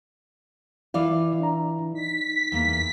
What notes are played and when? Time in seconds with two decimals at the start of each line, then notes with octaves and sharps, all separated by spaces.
0.94 E3 E4 F4 D5 F5 D6
1.40 D4 D5 A#5
1.94 D#4 B6
2.52 E2 A#3